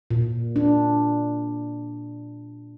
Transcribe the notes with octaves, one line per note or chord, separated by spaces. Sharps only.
A#2
D4